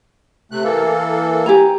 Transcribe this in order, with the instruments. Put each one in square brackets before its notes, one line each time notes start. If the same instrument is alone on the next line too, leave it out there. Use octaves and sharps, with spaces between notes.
[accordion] C3 A3 F#6
E3 A#3 A4
[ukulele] G4 G#5 A#5